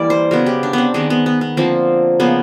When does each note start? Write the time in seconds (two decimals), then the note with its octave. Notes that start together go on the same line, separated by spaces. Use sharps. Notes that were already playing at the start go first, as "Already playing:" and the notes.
Already playing: E3 G3 A#3 D5
0.10 C5
0.31 C#3 F#3 B3 A#4
0.46 G4
0.63 D4
0.73 B3 C4
0.94 D#3 G#3 B3 C4
1.10 B3
1.26 B3
1.41 B3
1.57 D3 F3 A#3 C4
2.20 C#3 F3 A#3 B3